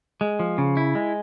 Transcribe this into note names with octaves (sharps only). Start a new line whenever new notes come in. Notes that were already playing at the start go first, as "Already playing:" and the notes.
G#3
F3
C#3
E4
G#3